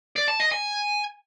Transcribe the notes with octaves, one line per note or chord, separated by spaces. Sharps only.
D5
A5
D#5
G#5